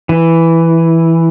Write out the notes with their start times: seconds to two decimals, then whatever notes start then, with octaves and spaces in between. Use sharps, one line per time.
0.09 E3